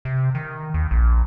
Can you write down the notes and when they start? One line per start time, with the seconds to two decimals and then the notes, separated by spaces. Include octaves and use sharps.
0.05 C3
0.35 D#3
0.74 D#2
0.91 A#1